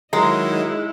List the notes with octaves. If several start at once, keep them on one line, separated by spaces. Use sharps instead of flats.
D#3 F#3 G#3 D#4 E4 A#5